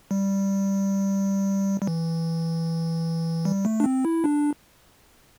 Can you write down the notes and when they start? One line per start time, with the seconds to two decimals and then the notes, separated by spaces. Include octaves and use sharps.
0.11 G3
1.82 G3
1.87 E3
3.45 G3
3.65 A3
3.80 D4
3.84 C4
4.05 E4
4.24 D4